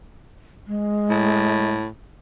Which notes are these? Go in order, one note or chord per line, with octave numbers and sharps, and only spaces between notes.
G#3
A2